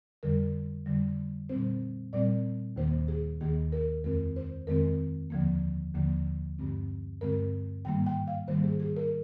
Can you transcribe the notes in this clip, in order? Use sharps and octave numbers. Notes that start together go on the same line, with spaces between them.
F2 D3 G3 A#4
F2 D3 G3
A#2 G3 C4 C5
A#2 G3 C4 D5
D#2 D#3 A#3 C5
G#4
D#2 D#3 A#3 G#4
A#4
F2 D#3 G#3 C4 A#4
C5
F2 D#3 G#3 C4 A#4
D#2 D3 F3 A#3
D#2 D3 F3 A#3
G2 D3 G#3 C4
G2 D3 G#3 C4 A#4
G#2 D#3 G3 A#3 G5
G5
F5
G#2 D#3 G3 A#3 C5
G#4
G#4
A#4